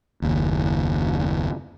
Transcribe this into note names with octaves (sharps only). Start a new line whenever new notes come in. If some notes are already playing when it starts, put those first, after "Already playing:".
F#1 D#2